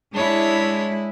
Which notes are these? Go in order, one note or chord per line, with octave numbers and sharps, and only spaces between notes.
G#3 D4 E4 C#5